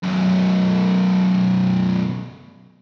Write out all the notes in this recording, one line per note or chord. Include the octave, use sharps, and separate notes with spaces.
B1 F#2